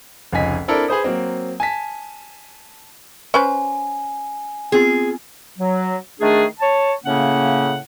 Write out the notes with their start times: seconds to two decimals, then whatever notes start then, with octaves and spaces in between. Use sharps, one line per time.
0.33 F1 C#2 D#4 G#5 B6
0.68 C4 D4 E4 A4 A#4 D5
0.88 G#4 B4 C5 D#6
1.04 F#3 A#3 C4
1.60 G#5 A5 B6
3.34 C#4 B4 C5 G#5
4.72 B3 C4 F4 G#4
5.58 F#3
6.20 D#3 A3 D4 G#4
6.60 C#5 A5
7.04 A2 C#3 A#3 C#4 F#5